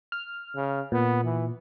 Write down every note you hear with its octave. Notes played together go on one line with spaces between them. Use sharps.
F6
C#3
A#2 B3
E3